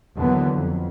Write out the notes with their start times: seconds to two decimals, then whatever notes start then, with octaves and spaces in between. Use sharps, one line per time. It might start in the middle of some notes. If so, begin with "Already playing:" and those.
0.15 D#2 D3 E3 F#3 B3
0.55 F2